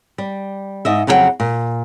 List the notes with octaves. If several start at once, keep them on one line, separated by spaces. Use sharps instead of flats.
G3
G#2 D#5 E5
F2 C#3 F#3 G#4 F#5 G5
A#2